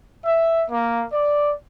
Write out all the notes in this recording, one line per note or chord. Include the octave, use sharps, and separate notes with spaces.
E5
A#3
D5